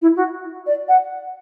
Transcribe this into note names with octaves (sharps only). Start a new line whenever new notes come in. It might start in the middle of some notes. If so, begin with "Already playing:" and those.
E4
F#4
D5
F#5